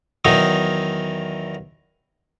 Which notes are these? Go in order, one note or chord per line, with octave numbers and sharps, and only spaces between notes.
E2 D#3 F#3 D#4